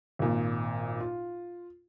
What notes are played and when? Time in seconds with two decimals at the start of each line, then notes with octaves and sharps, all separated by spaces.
0.19 G#1 A#2
1.00 F4